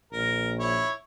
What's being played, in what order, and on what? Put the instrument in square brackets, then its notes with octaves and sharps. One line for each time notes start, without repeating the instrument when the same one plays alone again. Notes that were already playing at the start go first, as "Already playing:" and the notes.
[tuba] A#1 [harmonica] A#4
[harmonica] E4 C#5